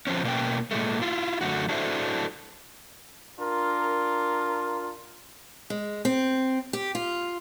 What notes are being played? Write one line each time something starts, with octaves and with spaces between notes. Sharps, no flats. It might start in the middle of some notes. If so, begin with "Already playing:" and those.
F3 C4 C#4
B2 A#3 C#4 G5
A#2 G#3 A3
E4 F4
F#2 D3 A3 F#4
D4 E4 F#4 A4 C5 E5
D4 F4 A#4
G#3
C4
G4
F4